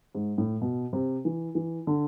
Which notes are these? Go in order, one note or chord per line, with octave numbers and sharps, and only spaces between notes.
G#2
A2
B2
C3
E3
E3
D3